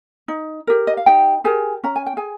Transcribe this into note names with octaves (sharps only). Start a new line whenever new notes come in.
D#4
G4 A#4
D#5
F5
D#4 G4 G5
G4 G#4 A#4 G#5
C#4 A#5
G#5
G5
G#4 G#5